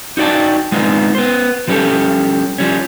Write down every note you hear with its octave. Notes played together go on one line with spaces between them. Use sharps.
D#4 F#4 D5 G5 A5
G#3 B3 C4 D4 D#4 F4
B3 C5
F3 G3 C#4 G4 A4
F3 G3 C#4